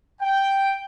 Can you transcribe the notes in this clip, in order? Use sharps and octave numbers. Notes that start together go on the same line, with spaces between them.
G5